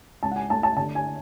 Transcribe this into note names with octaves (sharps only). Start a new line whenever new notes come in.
C#2 A5
F#5
G#5
A3 A5
A5
D3 A5
G#5